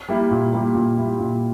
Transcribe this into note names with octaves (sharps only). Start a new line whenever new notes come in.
G3 A#3 E4
A#2
G3 A#3 E4
A#2
G3 A#3 E4
A#2